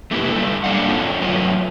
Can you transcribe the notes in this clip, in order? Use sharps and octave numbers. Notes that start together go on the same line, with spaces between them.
A3 A#3 E4 G4 B4
G3 A4
A#3 D4 F5 F#5
C4 F4 A4 C#5
F#3 A3 F4 B4 C#5